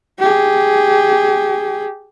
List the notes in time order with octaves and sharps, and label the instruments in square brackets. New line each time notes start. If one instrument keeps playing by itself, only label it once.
[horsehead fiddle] G4 G#4